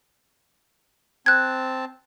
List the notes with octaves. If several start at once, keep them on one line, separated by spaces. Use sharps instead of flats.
C4 A5 F#6 G#6